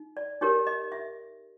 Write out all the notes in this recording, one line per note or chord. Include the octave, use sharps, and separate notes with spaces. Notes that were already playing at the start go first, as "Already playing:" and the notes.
Already playing: D#4
D5
D#4 G4 A#4 C#5
D#5
E5